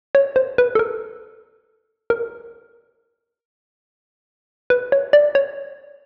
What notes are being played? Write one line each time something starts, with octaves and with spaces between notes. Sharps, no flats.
C#5
C5
B4
A4
A#4
A#4
B4
C#5
D5
C#5